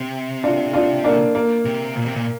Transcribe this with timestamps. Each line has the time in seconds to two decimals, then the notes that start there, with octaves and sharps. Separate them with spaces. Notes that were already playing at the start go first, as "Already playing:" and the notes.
Already playing: C3
0.44 D4 F4
0.73 D4 F4
1.04 A#3 D4
1.35 A#3
1.65 C3
1.96 A#2
2.06 C3
2.16 A#2